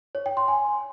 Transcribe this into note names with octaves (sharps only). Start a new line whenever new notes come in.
C#5
G5
C6
G#5